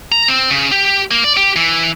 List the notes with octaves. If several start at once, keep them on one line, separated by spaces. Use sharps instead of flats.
A#5
C4
C#3
G4
A#3
D5
G4
E3